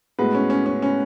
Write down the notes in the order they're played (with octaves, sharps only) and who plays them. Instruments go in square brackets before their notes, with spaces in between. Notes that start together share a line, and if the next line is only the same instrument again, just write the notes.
[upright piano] A2 G#3 B3 F#4 B4
[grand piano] C#4
C#4
C#4
C#4